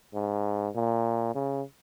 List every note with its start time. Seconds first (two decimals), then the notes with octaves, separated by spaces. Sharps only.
0.14 G#2
0.75 A#2
1.35 C#3